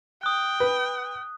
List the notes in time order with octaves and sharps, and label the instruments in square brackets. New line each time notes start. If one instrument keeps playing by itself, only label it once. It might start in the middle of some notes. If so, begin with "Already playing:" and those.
[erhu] G5 [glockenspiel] D#6 F#6
[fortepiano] B4